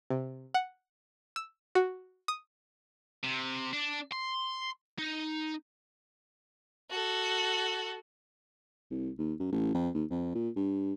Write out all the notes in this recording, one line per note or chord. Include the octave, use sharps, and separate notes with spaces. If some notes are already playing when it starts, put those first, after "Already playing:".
C3
F#5
E6
F#4
D#6
C3
D4
C6
D#4
F#4 A4
C2
D#2
F#2
A1
F2
D#2
F2
A#2
G2